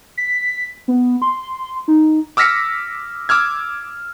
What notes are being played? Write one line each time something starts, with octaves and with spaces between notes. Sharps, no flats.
B6
B3
C6
D#4
D6 E6 F6 A#6 B6 C#7
D6 E6 F6 G#6